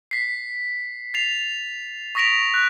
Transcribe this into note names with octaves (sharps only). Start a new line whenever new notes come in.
B6 C7
A6 C7 F7
C#6 D#6 A#6 B6 D7 F7
F#6